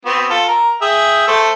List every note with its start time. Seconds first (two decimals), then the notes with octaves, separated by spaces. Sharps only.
0.06 B3 C4 F#4
0.30 F4 A4
0.48 A#4
0.82 G#4 E5 G5
1.28 A3 A4 C5